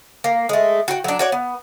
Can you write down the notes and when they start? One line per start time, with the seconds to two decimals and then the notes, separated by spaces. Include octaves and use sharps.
0.24 A#3
0.49 G#3 A3
0.88 F#4 G5
1.04 F#3 D4
1.19 F#4 C#5 D5
1.32 B3